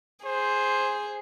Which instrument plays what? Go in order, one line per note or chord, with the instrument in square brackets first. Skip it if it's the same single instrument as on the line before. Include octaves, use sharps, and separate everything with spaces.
[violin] G#4 [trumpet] C5